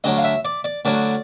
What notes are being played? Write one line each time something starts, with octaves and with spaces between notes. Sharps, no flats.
D2 D3 F#3 D#5
F5
E5
D5
D5
D2 D3 F#3 D5